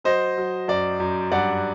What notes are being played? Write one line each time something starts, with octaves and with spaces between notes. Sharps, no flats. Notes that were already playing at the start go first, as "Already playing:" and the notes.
F#3 C5 D#5
F#3
F#2 D5
F#2
G2 D5 F#5